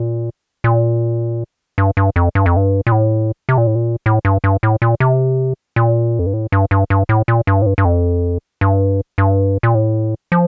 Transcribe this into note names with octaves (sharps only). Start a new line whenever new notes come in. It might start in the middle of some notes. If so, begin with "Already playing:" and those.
Already playing: A#2
A#2
G2
G2
F2
G2
F2
G2
A#2
A2
C3
A#2
A2
A#2
A2
G2
G2
A2
A#2
C3
A#2
F2
G2
A2
G2
G2
G2
A2
A#2
G2
A2
G2
G2
F2
G2
G2
A#2
A2
F3